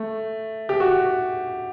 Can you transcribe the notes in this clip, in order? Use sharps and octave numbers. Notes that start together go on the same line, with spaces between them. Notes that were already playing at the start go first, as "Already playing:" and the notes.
Already playing: A3
G4
F#4